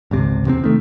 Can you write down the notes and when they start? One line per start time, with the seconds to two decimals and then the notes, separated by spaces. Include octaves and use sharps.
0.11 G#1 C#2 C3
0.46 E2 C3 A#3 C4
0.64 D#3 A3